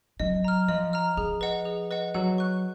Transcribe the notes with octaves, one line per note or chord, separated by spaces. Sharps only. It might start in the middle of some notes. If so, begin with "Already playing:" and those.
F#3 D#5
A#5 F6
F3 D#5
A#5 F6
F3 G#4
B4 D#5 F#5
G#4
B4 D#5 F#5
F#3 F#5
C#6 F#6